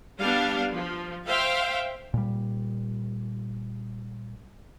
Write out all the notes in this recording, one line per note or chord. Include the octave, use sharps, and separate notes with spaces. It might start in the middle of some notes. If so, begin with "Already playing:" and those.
G3 B3 D4 F5
F3
C5 E5 F5 G5
A#2 G3